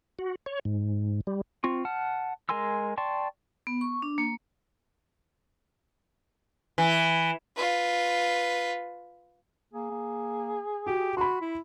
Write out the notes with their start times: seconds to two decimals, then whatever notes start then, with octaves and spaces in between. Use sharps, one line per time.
0.19 F#4
0.46 C#5
0.65 G#2
1.27 G3
1.64 C4 F4 C#6
1.85 F#5 A5 F6
2.49 G#3 A#4 G#5 C6 E6
2.98 D5 G5 A5 C6 C#6
3.67 B3
3.81 C#6
4.02 D4
4.18 A#3
6.78 E3
7.56 F4 B4
9.74 A#3 G#4
9.91 A#3
10.87 F#4 G4
11.17 F#4 B5 C6
11.41 E4